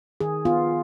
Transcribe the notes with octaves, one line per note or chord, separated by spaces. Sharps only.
D#3 G#4
B3 F4